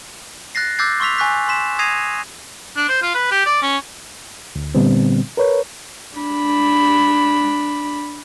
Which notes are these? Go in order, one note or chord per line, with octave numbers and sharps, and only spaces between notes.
F#6 A6 A#6 C7
D6 E6 F#6 G6 A6 C7
C6 C#6 E6 B6 F7
G#5 C#6 F#6 B6
C6 B6 E7
D#6 G#6 A#6 C7 D#7 F7
D4
C5
F4
B4
G4
D5
C#4
D2
A#2 D3 G3 B3 C4
A#4 B4 C#5
D4 B5